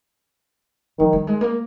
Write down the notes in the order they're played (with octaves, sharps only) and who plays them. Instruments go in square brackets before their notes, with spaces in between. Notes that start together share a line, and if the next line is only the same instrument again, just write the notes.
[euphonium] D#3 [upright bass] F3
[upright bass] G3
G#3
A#3